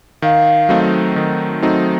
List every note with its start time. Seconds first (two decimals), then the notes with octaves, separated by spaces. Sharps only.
0.22 D#3 F5
0.69 F#3 A3 C4 D#4
1.16 D#3
1.62 F#3 A3 C4 D#4